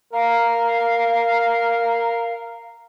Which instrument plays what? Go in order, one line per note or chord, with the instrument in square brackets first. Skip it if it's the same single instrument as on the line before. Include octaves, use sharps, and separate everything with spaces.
[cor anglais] A#4 [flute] F5